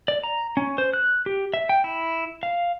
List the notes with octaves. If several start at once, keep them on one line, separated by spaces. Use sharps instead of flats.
D5
A#5
C#4
C5
F#6
G4
E5
G5
E4
F5